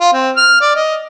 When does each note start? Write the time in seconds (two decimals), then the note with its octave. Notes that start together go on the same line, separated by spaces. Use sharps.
0.01 F4
0.13 C4
0.37 F6
0.61 D5
0.76 D#5